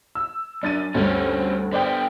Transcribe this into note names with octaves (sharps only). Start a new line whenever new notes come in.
E6
F#2 D4 A6 D#7
D2 G2 C4 C#4
D3 B3 C5 D5 G5